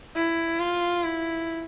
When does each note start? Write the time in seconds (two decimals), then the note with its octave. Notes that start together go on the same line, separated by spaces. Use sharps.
0.16 E4
0.59 F4
1.04 E4